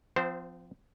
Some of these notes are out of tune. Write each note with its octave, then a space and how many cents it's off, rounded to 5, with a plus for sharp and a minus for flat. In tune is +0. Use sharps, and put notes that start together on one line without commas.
F3 +0 C4 -35 C5 +0